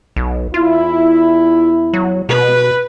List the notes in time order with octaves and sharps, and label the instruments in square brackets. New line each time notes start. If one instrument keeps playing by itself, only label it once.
[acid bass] B1
[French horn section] E2 E4 [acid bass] F4
[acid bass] F#3
[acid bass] B2 [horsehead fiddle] B4